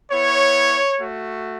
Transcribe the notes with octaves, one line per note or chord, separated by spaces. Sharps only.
B3 E4 C#5
A3 F#4